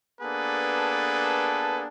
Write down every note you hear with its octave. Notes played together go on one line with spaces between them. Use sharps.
A#3 B3 D4 G#4 A4 B4